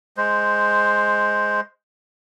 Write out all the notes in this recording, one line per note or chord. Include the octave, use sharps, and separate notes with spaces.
G#3 C5